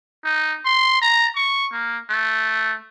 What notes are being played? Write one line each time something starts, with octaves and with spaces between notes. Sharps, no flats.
D#4
C6
A#5
C#6
A#3
A3